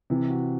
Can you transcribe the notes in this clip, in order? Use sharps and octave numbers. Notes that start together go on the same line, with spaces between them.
C3 E3
F#4